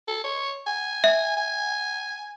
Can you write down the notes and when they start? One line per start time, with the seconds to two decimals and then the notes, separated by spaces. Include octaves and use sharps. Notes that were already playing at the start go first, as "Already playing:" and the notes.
0.08 A4
0.24 C#5
0.67 G#5
1.04 E5
1.37 G#5